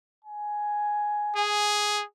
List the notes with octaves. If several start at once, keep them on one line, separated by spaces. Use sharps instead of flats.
G#5
G#4